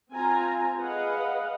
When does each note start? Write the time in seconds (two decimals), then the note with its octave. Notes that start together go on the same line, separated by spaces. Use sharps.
0.13 C4 F4 G#5 A#5
0.78 G#4 B4 D#5 F5 F#5